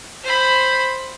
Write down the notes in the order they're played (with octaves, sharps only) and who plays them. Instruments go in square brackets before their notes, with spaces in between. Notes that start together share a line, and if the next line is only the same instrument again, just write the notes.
[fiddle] C5 B5